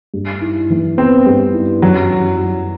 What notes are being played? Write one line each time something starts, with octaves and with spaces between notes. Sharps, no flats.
G2
E4
E3
B3 C4
G2
E4
F#2 F#3
F#2
F#3